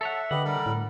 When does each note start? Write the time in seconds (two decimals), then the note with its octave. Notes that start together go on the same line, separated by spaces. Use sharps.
0.01 A4 C#5 E5 F#5
0.31 D3 G4 B4 D#5 F#5
0.45 G3 A4 A#4
0.66 A2